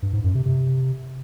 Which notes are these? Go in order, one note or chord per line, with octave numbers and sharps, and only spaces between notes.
G2
G#2
F#2
C3
C3